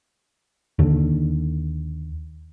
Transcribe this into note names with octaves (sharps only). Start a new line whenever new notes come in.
D#2 D3